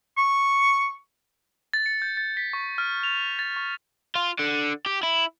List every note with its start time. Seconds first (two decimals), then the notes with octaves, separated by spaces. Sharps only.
0.18 C#6
1.73 A6
1.86 C#7
2.02 G6
2.17 A6
2.37 B6
2.53 C#6
2.78 F6
3.03 F7
3.39 A6
3.56 C#6
4.16 F4
4.39 D3
4.86 G4
5.03 E4